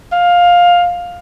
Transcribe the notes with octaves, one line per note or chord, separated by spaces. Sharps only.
F5